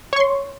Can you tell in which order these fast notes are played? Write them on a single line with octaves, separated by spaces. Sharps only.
C#5 C#6 C6